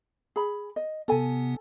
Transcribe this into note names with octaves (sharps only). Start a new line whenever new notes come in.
G#4 B5
D#5
C3 B3 A4 G#5